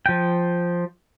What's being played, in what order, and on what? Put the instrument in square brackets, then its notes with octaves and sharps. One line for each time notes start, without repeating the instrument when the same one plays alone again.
[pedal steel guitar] F3 G5